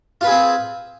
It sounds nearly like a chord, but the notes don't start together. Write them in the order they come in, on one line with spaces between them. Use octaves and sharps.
F4 B4 G#4 C4